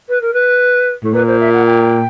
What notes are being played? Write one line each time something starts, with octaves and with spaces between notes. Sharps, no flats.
B4
A#4
B4
A2
A#2 B4
C5
E5
F#5
G5